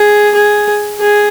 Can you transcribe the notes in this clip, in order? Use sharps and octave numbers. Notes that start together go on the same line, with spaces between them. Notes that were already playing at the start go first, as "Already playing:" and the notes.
Already playing: G#4
G#4
G#4